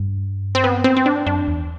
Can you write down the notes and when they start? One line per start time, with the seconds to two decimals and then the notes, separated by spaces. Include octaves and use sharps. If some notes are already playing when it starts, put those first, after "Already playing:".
Already playing: G2
0.55 C4
0.64 B3
0.84 C4
0.97 C4
1.06 D4
1.27 F#2 D4
1.48 E2